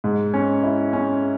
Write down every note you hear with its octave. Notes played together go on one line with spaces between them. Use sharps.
G#2
C#4
E4
C#4